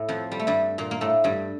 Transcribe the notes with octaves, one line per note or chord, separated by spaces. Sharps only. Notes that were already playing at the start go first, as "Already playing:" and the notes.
Already playing: A2 A3
F2 F3
G3
A3
G2 G3
A#2 A#3
A#3
A2 A3
G2 G3